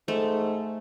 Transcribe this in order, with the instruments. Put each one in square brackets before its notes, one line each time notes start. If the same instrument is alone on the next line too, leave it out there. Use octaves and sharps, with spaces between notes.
[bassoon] G#2 [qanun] A3